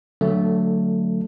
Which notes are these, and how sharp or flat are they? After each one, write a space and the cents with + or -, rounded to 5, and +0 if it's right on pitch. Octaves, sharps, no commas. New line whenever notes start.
D3 +0 F#3 +0 A3 +20